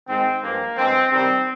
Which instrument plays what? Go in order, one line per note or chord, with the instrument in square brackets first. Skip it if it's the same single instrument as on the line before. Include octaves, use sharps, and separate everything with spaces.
[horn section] G#2 D#3 G#3 C4
G2 F3 G#3 A#3
G2 F3 G#3 C4
C3 D#3 G3 C4